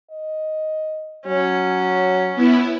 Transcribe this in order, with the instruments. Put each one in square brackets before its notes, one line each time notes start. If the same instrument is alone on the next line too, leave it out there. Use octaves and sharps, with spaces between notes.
[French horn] D#5
[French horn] F#3 [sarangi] C#4
[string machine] B3 E4